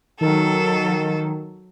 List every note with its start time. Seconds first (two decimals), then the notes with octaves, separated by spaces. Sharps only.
0.21 D#3 F#3 A4